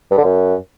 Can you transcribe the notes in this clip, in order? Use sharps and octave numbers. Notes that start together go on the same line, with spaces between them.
G2
D3
F#2